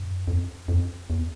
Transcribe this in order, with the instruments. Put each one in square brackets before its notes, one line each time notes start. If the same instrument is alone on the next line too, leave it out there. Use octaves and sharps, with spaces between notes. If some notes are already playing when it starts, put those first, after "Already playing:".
Already playing: [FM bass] F#2
F2
F2
E2